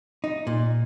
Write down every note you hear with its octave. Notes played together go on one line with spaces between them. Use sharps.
D#4
A#2